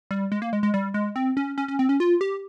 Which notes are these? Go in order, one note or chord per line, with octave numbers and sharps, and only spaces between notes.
G3
G#3
A#3
G#3
G#3
G3
G#3
C4
C#4
C#4
C#4
C4
C#4
F4
G4